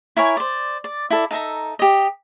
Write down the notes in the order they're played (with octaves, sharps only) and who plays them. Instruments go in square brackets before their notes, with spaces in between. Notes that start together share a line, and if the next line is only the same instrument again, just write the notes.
[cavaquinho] E4 A#4 C#5 G#5
C5 D5
D5
E4 A4 D5
D#4 A4 E5 A#5
G4 D#5